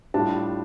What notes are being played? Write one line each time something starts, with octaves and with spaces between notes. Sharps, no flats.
A2 G3 D4 F4 A5